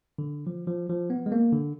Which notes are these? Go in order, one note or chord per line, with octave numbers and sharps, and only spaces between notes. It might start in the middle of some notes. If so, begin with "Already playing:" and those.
D3
F3
F3
F3
B3
G#3
A#3
D3